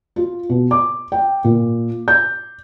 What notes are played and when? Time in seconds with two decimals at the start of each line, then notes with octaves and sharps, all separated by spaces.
0.16 F4
0.50 B2
0.71 D6
1.12 G5
1.44 A#2
2.08 G6